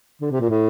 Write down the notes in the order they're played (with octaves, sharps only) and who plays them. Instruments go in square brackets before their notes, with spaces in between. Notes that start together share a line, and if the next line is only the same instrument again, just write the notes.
[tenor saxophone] D3
C3
A#2
A2